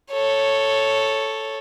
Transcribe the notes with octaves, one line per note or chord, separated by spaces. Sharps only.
A4 C#5